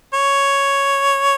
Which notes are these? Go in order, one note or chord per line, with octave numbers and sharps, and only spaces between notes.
C#5